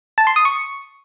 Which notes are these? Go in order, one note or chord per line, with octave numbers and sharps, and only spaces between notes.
A5
C6
D#6
C#6